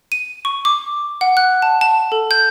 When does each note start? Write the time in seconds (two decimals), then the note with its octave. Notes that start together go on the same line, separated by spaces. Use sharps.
0.12 D#7
0.45 C#6
0.65 D6
1.21 F#5
1.37 F#6
1.62 A5
1.81 A5
2.12 A4
2.31 G6